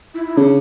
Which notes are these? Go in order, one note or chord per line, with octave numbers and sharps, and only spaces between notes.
E4
E4
C#3 D4